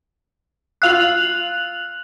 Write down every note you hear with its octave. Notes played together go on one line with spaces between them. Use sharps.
F4 F5 E6 F#6 F7 F#7